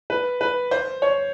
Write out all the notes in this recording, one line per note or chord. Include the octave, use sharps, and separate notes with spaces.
B4
B4
C5
C#5